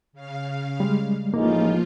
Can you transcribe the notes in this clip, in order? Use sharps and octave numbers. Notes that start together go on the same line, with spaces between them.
C#3 F5
G3 G#3
A1 F3 G#3 A#3 D#4 F4